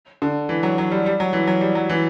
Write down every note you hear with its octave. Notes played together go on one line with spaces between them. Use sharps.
D3
E3
F#3
F#3
G3
G3
F#3
E3
F#3
G3
F#3
E3